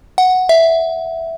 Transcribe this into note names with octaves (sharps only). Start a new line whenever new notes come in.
F#5
E5